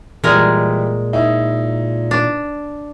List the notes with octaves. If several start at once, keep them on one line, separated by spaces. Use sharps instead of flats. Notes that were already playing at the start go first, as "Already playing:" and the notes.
A#2 E3 G3 G#3 A#4
D#4 E4
D4